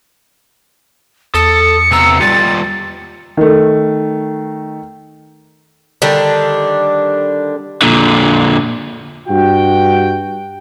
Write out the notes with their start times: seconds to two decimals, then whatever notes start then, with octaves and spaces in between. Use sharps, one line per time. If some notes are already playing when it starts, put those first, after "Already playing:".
1.34 E2 A4 D#6 C#7
1.91 C3 B3 A#5 E6
2.21 G3 F4 G4 A6
3.37 D#3 A3
6.02 D3 D#3 G3 D4
7.82 A#2 D3
9.28 G2 F#4 G5